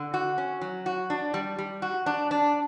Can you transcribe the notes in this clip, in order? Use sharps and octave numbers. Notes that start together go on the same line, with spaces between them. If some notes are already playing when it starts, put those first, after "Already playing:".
Already playing: D3
F#4
C#4
F#3
F#4
D4
G3
G3
F#4
D4
D4